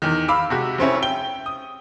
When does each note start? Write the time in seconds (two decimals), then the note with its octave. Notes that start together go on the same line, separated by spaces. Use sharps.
0.02 E2 D#3
0.28 F5 B5 D6 E6
0.50 C3 G#3 F#4 G4
0.78 F1 C4 C#4 E4
1.02 G5 G7
1.46 D#6